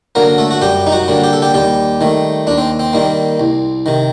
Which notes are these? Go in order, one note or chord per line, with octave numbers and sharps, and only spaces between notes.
D3 F#3 A#3 A#4
A3 A4
F#4
F#2 G3 G4
D#4
F#3 F#4
D3 G3 A#3
G4
A4
G3 G4
D#2 G3 G4
D#3 A3
D#2 D4
C4
C4
D#3 G3 A#3
C2
C3 D#3